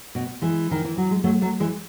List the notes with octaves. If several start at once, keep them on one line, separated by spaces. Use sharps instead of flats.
B2
E3 G#3
D#3
E3
F#3
G#3
F#3 A3
F#3 A3
E3 G#3